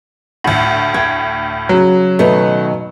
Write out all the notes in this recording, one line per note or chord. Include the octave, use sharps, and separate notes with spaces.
D2 A2
G5 G#6
C#3 F#3
B2 D#3 A3 D#4